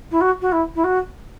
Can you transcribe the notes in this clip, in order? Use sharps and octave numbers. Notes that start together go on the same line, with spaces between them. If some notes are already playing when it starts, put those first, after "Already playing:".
E4
F#4
F#4
E4
E4
F#4